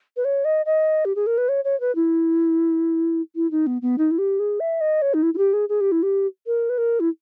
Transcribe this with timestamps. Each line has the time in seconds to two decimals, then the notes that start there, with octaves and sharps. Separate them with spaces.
0.17 B4
0.25 C#5
0.45 D#5
0.66 D#5
1.05 G4
1.16 G#4
1.27 A#4
1.38 B4
1.49 C#5
1.65 C#5
1.80 B4
1.95 E4
3.36 E4
3.51 D#4
3.67 B3
3.82 B3
3.98 D#4
4.11 E4
4.18 G4
4.39 G#4
4.60 E5
4.81 D#5
5.02 C#5
5.14 D#4
5.23 E4
5.34 E4
5.38 G4
5.53 G#4
5.69 G#4
5.81 G4
5.92 E4
6.03 G4
6.47 A#4
6.69 B4
6.78 A#4
7.00 E4